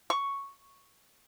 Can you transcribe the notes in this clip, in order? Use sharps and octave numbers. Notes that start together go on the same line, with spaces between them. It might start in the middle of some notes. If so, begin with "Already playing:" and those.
C#6